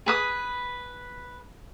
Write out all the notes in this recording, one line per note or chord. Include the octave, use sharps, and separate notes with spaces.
G#4 B4 D#6